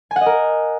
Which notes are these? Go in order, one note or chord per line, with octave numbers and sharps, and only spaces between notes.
G#5
F#5
D#5
A#4